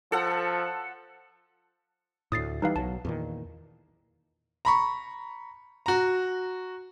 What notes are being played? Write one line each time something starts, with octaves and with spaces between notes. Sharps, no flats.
F3 A4 F#5
D2 A2 D#6 A6 C7
E3 G3 D#4 B4 F5
B1 F#3 A5
E2 A#2 D#3
A#5 B5 C#6
F#4 A#5